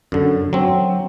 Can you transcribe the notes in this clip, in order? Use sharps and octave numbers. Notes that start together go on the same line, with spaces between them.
F#2 D3
F#3 C4